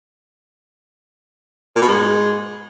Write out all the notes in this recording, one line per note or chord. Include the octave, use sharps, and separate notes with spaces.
A#2
B2
G#2